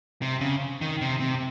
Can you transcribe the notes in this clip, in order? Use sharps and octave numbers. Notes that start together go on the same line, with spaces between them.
C3
C#3
D#3
C3
C3